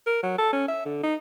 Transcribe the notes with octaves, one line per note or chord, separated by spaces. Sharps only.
A#4
F#3
A4
C#4
E5
D3
D#4